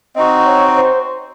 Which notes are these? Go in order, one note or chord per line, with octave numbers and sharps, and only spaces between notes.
C4 D#4 F#4 D#5
C#5
C5